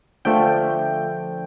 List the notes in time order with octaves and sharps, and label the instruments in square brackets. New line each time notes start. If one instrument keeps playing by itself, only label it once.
[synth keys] D3 F3 A3 G5